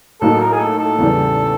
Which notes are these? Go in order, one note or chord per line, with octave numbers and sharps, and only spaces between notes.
A2 F#3 A#3 D#4 F#4 A4
A#4
G#4
A4
A4
E2 C#3 E3 G3